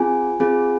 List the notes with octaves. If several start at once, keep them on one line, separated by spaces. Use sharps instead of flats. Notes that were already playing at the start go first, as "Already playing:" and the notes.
Already playing: C4 F4 G#4 G#5
C4 F4 G#4